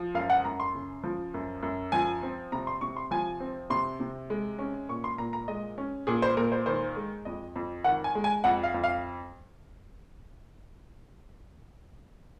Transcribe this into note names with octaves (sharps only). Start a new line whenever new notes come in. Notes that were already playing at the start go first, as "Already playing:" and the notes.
Already playing: F3
F#2 F5
F#5
F#2 A#5
C6
C#3
F3
F#2
F#2
F3 G#5
C4
C3 A#5
C6
C3 C#6
C6
F3 G#5
C4
C3 C6
C3
G#3
C#4
A#2 C#6
C6
A#2 A#5
A#5
G#3 D#5
C#4
A#2 G#4
C5
A#2 A#4
C5
D#3 C5
G#3
F2 D#5
F2
D#3 F#5
G#5
G#3
G#5
F2 F#5
F5
F2
F5